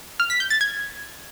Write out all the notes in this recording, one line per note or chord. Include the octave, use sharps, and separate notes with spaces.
F6
B6
G6
A6
G#6